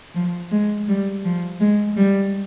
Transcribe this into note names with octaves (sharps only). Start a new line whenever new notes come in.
F3
G#3
G3
F3
G#3
G3